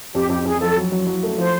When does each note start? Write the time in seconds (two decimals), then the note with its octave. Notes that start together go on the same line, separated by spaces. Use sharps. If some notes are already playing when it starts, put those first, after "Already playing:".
0.14 F2 G4
0.29 F2 G4
0.45 F2 G#4
0.61 F3 A4
0.76 F#3
0.92 F#3
1.07 F#3
1.23 A3
1.38 F3 C5